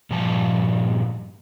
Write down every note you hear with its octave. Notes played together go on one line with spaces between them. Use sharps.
G2 A#2 F3 A5